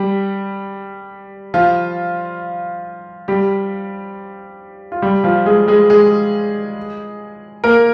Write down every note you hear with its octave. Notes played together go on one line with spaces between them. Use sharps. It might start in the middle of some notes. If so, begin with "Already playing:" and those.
Already playing: G3 G4
F3 F4
G3 G4
F4
G3 G4
F3 F4
G#3 G#4
G#3 G#4
G#3 G#4
A#3 A#4